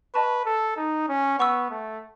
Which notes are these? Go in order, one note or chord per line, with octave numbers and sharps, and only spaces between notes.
B4 D#5 A5 C#6
A4
D#4
C#4
B3 F#5 C#6 E6
A3